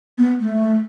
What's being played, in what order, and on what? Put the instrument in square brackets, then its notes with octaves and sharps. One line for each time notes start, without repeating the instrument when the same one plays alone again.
[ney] B3
A3